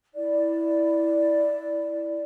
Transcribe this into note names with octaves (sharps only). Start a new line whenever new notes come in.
E4 D5